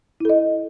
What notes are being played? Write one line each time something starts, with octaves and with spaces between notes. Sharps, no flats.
E4 A4 D#5